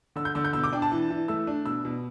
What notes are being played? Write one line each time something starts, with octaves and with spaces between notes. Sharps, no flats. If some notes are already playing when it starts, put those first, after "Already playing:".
D3 E6
G6
D3 E6
G6
B2 E6
D6
D4 G5
A5
E3
E3
A3 E6
D4
B2 E6
B2